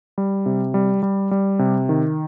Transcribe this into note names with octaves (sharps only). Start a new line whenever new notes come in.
G3
C3
G3
G3
G3
C3
D#3